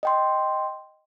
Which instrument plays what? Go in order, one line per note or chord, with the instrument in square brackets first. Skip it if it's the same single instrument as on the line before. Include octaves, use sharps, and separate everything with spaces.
[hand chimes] D#5 G5 C6